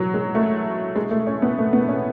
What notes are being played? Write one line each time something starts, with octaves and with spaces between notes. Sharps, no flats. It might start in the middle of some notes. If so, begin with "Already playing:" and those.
Already playing: F#3
G#3
A3
G#3
A3
C#4
B3
A3
B3
C#4